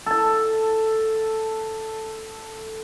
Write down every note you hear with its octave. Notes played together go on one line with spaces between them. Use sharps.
A4 A5